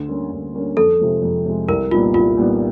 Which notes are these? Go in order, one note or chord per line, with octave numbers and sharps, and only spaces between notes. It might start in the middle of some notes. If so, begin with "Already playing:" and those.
Already playing: D2
D3 G3 A#3 C#4
D2
D3 G3 A#3 C#4
F2 A4
C3 F3 G#3
F2
C3 F3 G#3
C2 A#4
A#2 G3 B3 D#4 F4
C2 F4
A#2 G3 B3 D#4